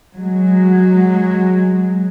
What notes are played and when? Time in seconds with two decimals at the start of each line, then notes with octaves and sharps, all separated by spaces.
0.15 F#3 G#3